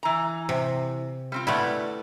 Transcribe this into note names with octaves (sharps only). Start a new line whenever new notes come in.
E3 A#5
C3
G3 C4 F4
G3 A3 B3 E4 D5 F#5